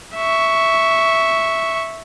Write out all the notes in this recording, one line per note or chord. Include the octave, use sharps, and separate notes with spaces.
E5 C#6